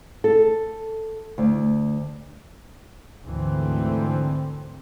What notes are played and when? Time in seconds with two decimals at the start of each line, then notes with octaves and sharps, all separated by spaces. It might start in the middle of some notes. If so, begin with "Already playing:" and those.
0.24 A4
1.38 D2
3.25 D2 G#2 D3 E3 C4